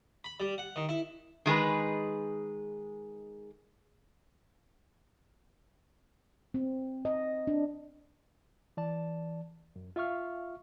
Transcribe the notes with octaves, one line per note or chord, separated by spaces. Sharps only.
B5
G3
F#5
D#3
E4
D#3 G#3 G#4 B4
C4
D#5
D4
E3 D5 A5
F#2
F4 E5 F5 C#6 F6